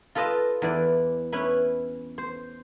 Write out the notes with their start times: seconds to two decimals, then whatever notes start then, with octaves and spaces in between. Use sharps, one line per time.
0.15 F4 A4 B4 D#5 A5
0.62 E2 E3 D5
1.33 C#4 E4 B4
2.18 C5